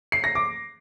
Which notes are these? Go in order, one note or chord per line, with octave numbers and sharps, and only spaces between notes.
C7
A#6
D6